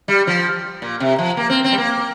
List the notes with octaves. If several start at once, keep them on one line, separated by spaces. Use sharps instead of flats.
G3
F3
A#2
C3
F3
A#3
C4
C4
G3
A#3